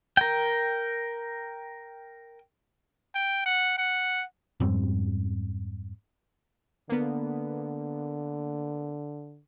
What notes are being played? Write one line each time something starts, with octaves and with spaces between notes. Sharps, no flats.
A#4 G5
G5
F#5
F#5
F2 G#2 G3 C4
D3 A#3 B3